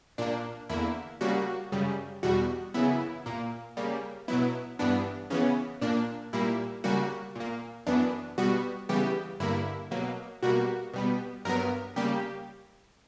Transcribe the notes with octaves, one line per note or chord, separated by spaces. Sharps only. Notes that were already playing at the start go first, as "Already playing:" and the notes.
A#2 A#3 D4
E2 D3 A#3 E4
C#3 G3 A#3 F#4
F#2 C#3 G3
E2 B2 G3 F#4
F#2 C#3 E3 B3 E4
A#2 A#3
C#3 G3 A#3
B2 F#3 B3 E4
G2 E3 B3 D4
C#3 E3 B3 C#4
A#2 A#3 D4
A#2 G3 A#3 E4
C#3 G3 A#3 F#4
A#2 A#3
F#2 E3 B3 D4
B2 G3 B3 F#4
C#3 E3 G3 B3 G4
G2 D3 A#3 E4
B2 F#3 A#3
B2 G3 A#3 F#4
B2 G3 B3
G2 F#3 B3 A#4
C#3 G3 A#3 G4